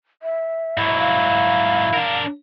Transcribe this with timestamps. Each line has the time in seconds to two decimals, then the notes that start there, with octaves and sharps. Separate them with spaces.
0.23 E5
0.77 G#2 F#3 E4
0.99 F5
1.94 D4 A#4